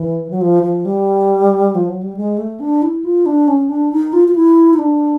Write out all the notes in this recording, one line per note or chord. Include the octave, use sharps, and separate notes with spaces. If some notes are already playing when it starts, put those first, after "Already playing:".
Already playing: E3
F#3
F3
F3
G3
F3
F#3
G3
G#3
A3
D4
E4
F4
D4
C#4
D4
D#4
F4
F4
E4
D#4
D4